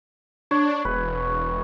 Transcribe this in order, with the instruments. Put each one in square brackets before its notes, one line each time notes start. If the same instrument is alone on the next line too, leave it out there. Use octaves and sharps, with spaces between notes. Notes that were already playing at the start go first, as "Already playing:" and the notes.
[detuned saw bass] D4 [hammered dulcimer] C#5
[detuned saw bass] E1 [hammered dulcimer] B4